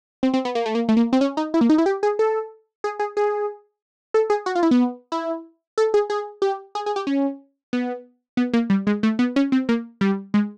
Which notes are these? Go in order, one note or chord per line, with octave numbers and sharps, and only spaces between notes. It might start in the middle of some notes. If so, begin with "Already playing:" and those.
C4
C4
B3
A#3
A3
A#3
A3
A#3
C4
C#4
D#4
E4
A#3
D#4
E4
G4
G#4
A4
G#4
G#4
G#4
A4
G#4
F#4
F4
E4
B3
E4
A4
G#4
G#4
G4
G#4
G#4
G4
C#4
B3
B3
A#3
G3
G#3
A3
B3
C#4
C4
A#3
G3
G#3